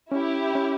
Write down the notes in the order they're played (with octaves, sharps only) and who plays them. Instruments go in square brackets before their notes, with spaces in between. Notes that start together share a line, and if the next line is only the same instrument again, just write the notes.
[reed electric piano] C#4 [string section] E4 G4
[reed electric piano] C#4